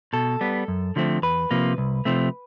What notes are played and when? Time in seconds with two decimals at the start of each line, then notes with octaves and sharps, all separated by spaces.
0.13 B2 A4
0.41 G3 B3
0.68 F#2
0.96 D3 F3 A3 C4
1.22 E2 B4
1.51 C3 F3 A#3
1.78 C2
2.05 C3 F3 A3 C4